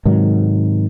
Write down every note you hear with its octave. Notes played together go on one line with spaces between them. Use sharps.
G#2 C3 D#3 F#3